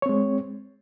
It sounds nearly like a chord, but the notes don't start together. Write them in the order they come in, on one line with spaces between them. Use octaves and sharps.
C#5 C4 G#3